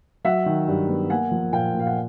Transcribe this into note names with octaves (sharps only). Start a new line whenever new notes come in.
F#3 E5 F#5
D#3
G2
B3
A#3 F#5 G#5
F3
A#2 F5 G5
A#2
F5
F#5